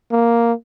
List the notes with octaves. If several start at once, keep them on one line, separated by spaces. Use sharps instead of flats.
A#3